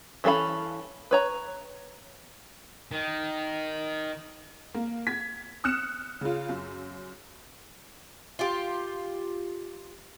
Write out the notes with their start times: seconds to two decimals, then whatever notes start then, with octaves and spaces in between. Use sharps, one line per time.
0.24 E3 C#4 A4 F5 B5
1.11 B4 C#5 A#5
2.92 D#3
4.74 A#3
5.07 G#6 B6
5.64 D#6 F6 F#6 C#7 E7
6.21 C#3 F4
6.49 F#2
8.39 F4 G4